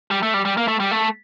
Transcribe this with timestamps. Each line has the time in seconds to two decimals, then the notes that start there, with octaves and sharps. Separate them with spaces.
0.11 G3
0.23 A3
0.34 G3
0.45 G3
0.57 A#3
0.68 A3
0.80 G3
0.91 A3